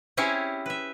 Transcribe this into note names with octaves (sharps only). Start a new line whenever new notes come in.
C4 C#4 E4 G4 G#4 C#5
B4 E5